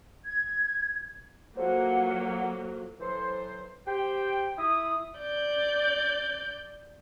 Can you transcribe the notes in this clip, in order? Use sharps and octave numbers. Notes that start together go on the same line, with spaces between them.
G#6
F#3 A#3 F4 A4 C5 F#5
E3 F#3 A4 C5
G4 C5 G5
E4 D#6
D5 G6